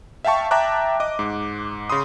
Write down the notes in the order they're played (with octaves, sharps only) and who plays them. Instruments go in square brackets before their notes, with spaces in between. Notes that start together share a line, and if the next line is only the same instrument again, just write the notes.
[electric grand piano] E5 F5 G5 A5 C#6
E5 G5 A5 A#5 D6 F#6
D#5 D6
G#2
C#3 B5 C6 D#6